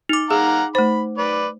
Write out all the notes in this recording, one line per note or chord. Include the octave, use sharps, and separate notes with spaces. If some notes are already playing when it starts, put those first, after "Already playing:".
D#4 D6
G#4 F5 F#5 A#5
A3 C5 B5
B4 D5